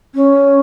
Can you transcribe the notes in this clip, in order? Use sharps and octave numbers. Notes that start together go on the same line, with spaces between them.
C#4